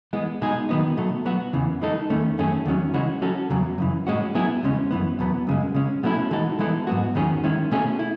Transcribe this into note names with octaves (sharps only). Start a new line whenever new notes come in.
E3 G#3 B3
B2 G#3 D#4 G#4
D#3 F#3 B3 D#4
B2 F#3 A3
F#3 B3 F#4
E2 C#3 E3
E3 G#3 D#4 A4
E2 D#3 A3 C#4
F#2 D#3 A3 C#4 G#4
E2 D#3 F#3 C#4
C#3 E3 G#3 C#4 F#4
F#3 C#4 F#4 A4
E2 C#3 F#3
F#2 C#3 E3
A2 G#3 C#4 F#4
B2 F#3 B3 E4 G#4
E2 C#3 G#3 C#4
F#2 E3 B3
E2 B2 F#3 B3
F#2 C#3 G#3
C#3 G#3 C#4
B2 F#3 A3 C#4 E4
E3 G#3 D#4 F#4 A4
E3 G#3 B3 E4 A4
G#2 F#3 B3 F#4
E2 D#3 F#3 C#4 G#4
D#3 G#3 C#4 E4
B2 A3 C#4 G#4
E4